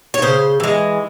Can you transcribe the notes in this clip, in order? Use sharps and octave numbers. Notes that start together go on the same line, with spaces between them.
C#5
C#3 C5
E3 G#3